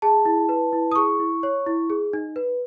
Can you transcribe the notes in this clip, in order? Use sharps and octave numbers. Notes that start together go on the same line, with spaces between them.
G#4 A5
E4
B4
E4
D#6
G#4 C#6
E4
C#5
E4
G#4
D#4
B4